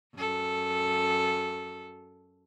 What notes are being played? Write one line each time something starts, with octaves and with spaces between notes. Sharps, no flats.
F#2 A4